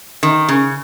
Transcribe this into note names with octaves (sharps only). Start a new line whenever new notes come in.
D#3
C#3